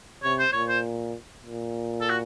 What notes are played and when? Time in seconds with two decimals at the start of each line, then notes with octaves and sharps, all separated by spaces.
0.23 C3 C#5
0.39 C5
0.53 A#2 C#5
0.68 C5
1.43 A#2
2.01 A4
2.09 F#4